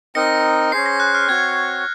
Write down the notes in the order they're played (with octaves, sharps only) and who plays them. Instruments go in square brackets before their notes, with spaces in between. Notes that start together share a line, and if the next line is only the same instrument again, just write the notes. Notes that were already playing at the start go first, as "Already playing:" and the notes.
[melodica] C4 D#4 A#4 D#5 [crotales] A#6 C#7
[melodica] C#4 G#4 C5 [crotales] C7
[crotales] A#6
F#6
F6
[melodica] C4 F#4 C#5 [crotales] G#6